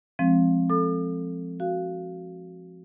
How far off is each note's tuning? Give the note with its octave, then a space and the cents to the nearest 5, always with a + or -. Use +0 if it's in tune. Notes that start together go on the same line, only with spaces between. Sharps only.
F3 -5 G#3 +5 C4 +15
A4 +0 D6 +45
F#4 +0 F5 -10